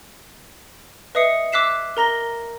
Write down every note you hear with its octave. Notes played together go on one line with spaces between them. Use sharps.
B4 D#5 E5 D#6 C7 C#7
D6 E6 F#6 B6 C7 E7
A#4 A#5 A#6 G7